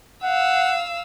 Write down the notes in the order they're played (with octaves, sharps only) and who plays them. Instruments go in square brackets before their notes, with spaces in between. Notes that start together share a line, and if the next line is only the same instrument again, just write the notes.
[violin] F5 E6 [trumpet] F#5